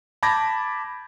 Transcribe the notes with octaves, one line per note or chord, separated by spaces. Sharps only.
A5 B5 D6 G6 G#6 A#6